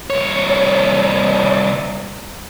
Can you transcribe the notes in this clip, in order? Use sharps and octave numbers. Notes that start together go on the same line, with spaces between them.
C2 C#5